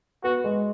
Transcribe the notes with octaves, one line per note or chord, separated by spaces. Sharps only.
B3 F#4
G#3